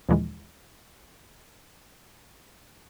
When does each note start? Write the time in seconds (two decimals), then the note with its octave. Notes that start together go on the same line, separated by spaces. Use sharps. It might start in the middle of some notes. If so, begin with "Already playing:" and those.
0.09 D#2 A#2 D3 E3 F3 G#3